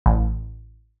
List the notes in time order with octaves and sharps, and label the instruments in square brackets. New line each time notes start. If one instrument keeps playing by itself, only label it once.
[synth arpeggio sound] A1